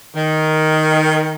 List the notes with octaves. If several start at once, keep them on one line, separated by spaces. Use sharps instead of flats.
D#3